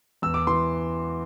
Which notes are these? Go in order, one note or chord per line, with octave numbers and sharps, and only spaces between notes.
E2 E6
D6
E3 C6